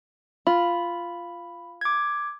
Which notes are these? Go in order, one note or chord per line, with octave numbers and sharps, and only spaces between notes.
F4 B5
D6 G#6